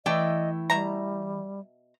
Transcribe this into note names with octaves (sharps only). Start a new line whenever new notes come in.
E3 A3 E4 D5 D#5 G5
B2 G3 E5 A#5